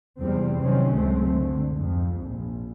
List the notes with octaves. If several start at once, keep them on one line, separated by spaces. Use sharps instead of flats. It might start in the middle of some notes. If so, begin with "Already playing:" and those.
F1 E2 G3 C4
C3 D#3 F#3 C4 C#4
C#2 F#2 G#3 A3 C4
D3
F2 G#2
A#1